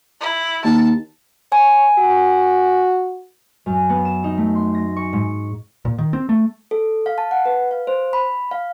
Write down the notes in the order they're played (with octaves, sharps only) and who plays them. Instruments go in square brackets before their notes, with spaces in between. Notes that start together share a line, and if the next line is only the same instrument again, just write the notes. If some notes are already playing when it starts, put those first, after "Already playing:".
[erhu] E4
[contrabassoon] D#2 [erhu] A5
[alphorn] C#5 [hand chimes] G#5
[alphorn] F#4
[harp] F#2
B3
E7
D#4
A3
C6
A#6
C#6
G#2
[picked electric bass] A#2
D#3
C4
A3
[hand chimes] A4
F5
A5
F#5
B4
F5
C5
B5
F5